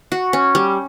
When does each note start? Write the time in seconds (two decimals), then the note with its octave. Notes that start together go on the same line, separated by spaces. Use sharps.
0.12 F#4
0.33 C#4
0.55 G3